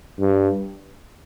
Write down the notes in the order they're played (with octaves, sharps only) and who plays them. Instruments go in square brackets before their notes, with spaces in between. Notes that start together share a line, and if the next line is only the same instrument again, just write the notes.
[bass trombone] G2